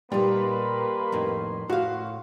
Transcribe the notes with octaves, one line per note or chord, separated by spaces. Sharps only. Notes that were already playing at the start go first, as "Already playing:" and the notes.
A#2 G3 A#3 D#4 B4 C6
F2 A2 D#3
A2 F#4 F5